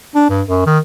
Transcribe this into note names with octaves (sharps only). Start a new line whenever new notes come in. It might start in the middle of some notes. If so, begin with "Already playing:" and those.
D4
G2
F#2
D#3